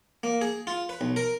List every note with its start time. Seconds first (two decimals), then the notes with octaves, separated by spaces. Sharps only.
0.23 A#3
0.41 G#4
0.67 F4
0.89 B4
1.01 B1
1.16 A#4